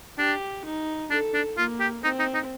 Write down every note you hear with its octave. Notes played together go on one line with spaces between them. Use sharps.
D4 G4
D#4
D4 A4
D4
A#3 F4
G4
C4 D#4
D#4
D#4